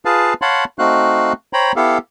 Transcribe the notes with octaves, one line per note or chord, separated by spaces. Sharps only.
F4 G#4 B4 F5 A5
C#5 F5 F#5 A5 B5 C6
A3 C4 D#4 F#4 F5 F#6
C5 C#5 G5 A#5 B5
B3 E4 G4 A4 F5